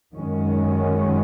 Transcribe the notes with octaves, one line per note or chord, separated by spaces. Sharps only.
F#2 D#3 G#3 C#4